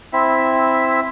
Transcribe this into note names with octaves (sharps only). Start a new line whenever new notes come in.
C4 E4 E5